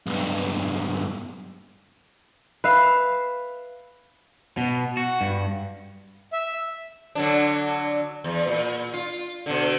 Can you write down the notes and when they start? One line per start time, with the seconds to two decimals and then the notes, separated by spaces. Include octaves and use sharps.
0.07 B1 G2
2.64 B4 E5 F5
4.57 B2
4.97 F#4
5.21 G2
6.33 E5
7.15 D3 F#3 D4
8.24 E2
8.47 A#2
8.94 F4
9.46 B2 D3